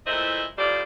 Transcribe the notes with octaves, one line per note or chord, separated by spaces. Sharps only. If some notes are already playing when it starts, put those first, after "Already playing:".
A#2 E3 A3 E4 C5 D#5
A2 F3 G3 C5 D5